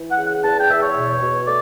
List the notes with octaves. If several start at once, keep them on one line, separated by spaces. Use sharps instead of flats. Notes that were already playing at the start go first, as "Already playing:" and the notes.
Already playing: E3
F#5
C#3
F#5
E2 A5
G5
E2 E5
C#5
B2
B2
A3 D5